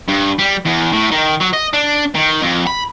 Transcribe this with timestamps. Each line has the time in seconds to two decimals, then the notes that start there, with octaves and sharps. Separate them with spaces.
0.08 G2
0.39 G3
0.66 E2
0.93 A2
1.12 D#3
1.41 F#3
1.54 D#5
1.74 D4
2.15 D#3
2.42 F2
2.67 B5